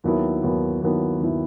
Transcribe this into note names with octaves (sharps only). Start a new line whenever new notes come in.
D#2 D#3 F#3 B3 E4
D#2 D#3 F#3 B3 E4
D#2 D#3 F#3 B3 E4
D#2 D#3 F#3 B3 E4